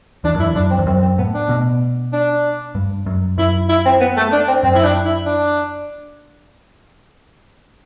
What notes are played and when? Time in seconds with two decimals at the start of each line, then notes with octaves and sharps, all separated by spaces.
0.24 E2 D4
0.34 F#2
0.40 E4
0.44 E2
0.55 F#2 D4
0.70 C4
0.78 E2
0.87 F#2 C4
1.02 C4
1.17 A2 B3
1.34 D4
1.49 B2
2.13 D4
2.75 G2
3.06 F#2
3.38 F#2 E4
3.69 E4
3.85 C4
4.00 B3
4.17 A3
4.32 D4
4.48 C4
4.63 F#2 C4
4.75 E4
4.84 D4
5.05 E4
5.26 D4